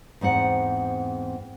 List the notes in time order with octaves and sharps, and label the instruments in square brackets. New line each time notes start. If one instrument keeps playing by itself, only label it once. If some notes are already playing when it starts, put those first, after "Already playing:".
[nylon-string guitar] E2 G#2 C4 F#5